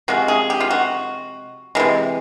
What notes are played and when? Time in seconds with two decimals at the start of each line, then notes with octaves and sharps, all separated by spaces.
0.08 C3 F3 G#3 F#4
0.28 G#4
0.50 G4
0.60 F4
0.70 F#4
1.75 C3 E3 G#3